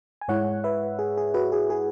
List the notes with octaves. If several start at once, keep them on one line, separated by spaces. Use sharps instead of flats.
G#5
G#2 G#3 E4 C#5 F#5
B4 E5
G#4
G#4
F#4 B4
G#4
G#4